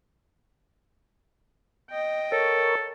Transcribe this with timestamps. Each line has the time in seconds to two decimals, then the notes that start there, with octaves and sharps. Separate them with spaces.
1.90 D#5 G5
2.32 A4 A#4 C#5